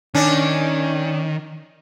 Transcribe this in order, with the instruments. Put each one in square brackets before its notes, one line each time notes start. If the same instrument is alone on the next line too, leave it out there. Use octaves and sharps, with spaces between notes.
[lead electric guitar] D#3 [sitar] C#4 D4